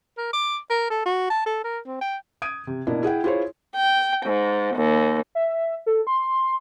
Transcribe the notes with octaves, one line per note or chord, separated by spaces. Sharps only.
A#4
D6
A#4
A4
F#4
A5
A4
A#4
C4
G5
D#6 G#6 D7 D#7
C3
B2 A#3 D4 E4
E4 G#4 F#5 G5
E4 F4 G#4 C5 C#5
G5
G#2
D#2
E5
A4
C6